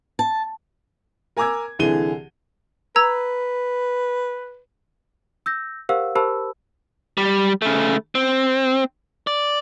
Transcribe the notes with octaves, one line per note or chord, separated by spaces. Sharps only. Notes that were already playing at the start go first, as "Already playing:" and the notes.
A5
A#4 G#5 A#5 D6 E6 G#6
C2 D3 E3 G#4 D#7 G7
B4 A#5 E6 G#6
E6 G6 A#6
G4 A#4 C5 F5 F#5 E6
G4 A#4 C5 A5 B5 E6
G3
C#3 A3
C4
D5